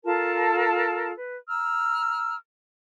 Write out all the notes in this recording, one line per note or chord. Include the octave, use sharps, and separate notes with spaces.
F4 A4 A#4 A5
B4
A#5 E6 F6